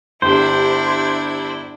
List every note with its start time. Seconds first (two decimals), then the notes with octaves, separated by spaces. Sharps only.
0.22 G1 D4 E4 G4 C5